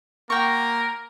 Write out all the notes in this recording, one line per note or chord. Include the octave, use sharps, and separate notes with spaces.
A#3 F#4 A#4 G5 C#6